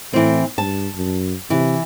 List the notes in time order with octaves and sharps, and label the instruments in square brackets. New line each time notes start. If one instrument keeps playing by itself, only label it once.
[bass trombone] A2 [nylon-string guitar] E3 C4
[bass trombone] G2 [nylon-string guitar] A5
[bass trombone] F#2
[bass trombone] C3 [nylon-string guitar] E3